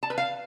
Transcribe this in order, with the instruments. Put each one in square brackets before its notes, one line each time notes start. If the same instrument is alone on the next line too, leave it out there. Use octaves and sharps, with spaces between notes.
[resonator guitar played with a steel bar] A5
B4
F5